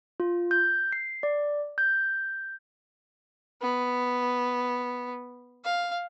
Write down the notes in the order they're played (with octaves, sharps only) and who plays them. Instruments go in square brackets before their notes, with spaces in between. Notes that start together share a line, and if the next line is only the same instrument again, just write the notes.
[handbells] F4
G6
C7
D5
G6
[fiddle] B3
F5